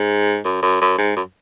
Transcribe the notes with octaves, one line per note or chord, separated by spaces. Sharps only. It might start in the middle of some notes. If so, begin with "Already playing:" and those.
Already playing: G#2
F#2
F#2
F#2
G#2
F#2